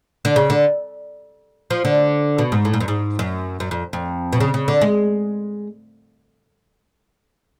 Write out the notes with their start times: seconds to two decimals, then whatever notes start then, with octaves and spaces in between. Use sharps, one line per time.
0.25 D3
0.36 C#3
0.50 D3
1.70 F3
1.85 D3
2.38 B2
2.52 G#2
2.65 A2
2.74 G#2
2.81 F#2
2.88 G#2
3.19 F#2
3.60 F#2
3.71 F2
3.93 F2
4.33 B2
4.40 C#3
4.54 C#3
4.68 D3
4.81 G#3